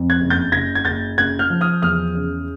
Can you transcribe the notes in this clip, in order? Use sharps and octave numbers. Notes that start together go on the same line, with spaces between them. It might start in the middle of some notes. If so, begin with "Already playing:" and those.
Already playing: F2
F#6 G#6
F#1
G6 A6
F#1 G#6 A#6
G#6
F#1 G6 A6
C#3 F#6 G#6
F6 G6
F3
D#6 F6
E2 D#6 F6
C#3